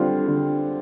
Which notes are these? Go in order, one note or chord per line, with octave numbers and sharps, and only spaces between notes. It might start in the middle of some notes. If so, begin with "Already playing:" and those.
Already playing: D3 G3 C4 F4
D3